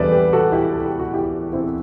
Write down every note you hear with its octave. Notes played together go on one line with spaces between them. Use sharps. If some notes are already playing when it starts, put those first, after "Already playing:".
Already playing: E2 D3 G3 A4 B4 C5 D5 E5
G4 B4
F#4 A4
E4 G4
A4
G4
F#4
E4 G4
C4 E4